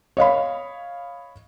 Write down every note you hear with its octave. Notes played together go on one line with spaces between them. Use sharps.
C#5 D#5 F5 B5